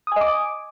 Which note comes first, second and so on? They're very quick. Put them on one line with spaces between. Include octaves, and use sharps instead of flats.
D#6 G#5 D#5 D6